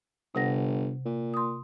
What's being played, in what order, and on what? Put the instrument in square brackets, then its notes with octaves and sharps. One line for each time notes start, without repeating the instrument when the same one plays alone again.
[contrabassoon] G1 [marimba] C3 F#5 A#6
[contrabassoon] A#2
[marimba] C6 D#6